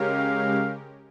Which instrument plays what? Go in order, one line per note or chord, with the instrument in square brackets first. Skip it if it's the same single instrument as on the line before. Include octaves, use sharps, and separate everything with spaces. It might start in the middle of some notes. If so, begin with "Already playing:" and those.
Already playing: [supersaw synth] C#3 G#3 C#4 G4 A#4 [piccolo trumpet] F5